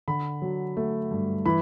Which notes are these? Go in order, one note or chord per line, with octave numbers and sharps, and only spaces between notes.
D3 B5
F#3
A3
G2
E3 B5